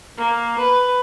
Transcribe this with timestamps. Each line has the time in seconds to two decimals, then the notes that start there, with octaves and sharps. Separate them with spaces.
0.17 A#3
0.59 B4